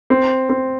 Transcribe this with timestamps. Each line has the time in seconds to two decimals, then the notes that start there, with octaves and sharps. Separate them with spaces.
0.10 C4
0.49 C4